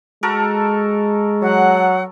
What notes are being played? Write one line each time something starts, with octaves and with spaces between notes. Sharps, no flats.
G#3 F#4 A4 A#4
F#3 F#5